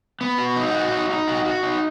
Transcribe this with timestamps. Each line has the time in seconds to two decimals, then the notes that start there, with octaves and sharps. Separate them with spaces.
0.21 B3
0.38 F#4
0.56 D#4
0.74 F#4
0.92 D#4
1.10 D#4
1.28 F#4
1.45 F#4
1.63 D#4